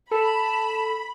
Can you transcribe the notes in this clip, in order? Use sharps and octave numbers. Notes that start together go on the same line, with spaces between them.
A4 A5 B5